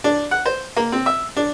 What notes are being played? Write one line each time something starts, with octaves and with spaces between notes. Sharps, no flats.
D4
F#5
C5
A#3
C4
E5
D4